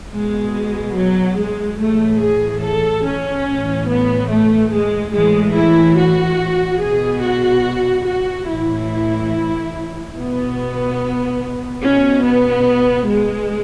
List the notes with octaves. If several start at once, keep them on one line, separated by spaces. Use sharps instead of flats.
B2 G#3
F#3
G#3
A2 E3 A3
G#4
A4
C#4
A2 E3
B3
A3
G#3
A2 E3 G#3
E4
F#4
B2 G#4
F#4
F#4
A2 E3 E4
B2 B3
B2 C#4
B3
G#3